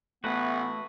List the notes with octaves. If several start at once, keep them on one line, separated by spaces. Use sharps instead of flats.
A1 A3 B3 F#4 B4 F#5